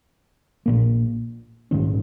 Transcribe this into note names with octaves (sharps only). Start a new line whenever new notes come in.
A#1 A#2 A#3
A#1 G#2 D#3 C#4